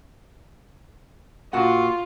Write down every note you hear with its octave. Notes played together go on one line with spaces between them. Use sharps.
A#2 F4 F#4 F#5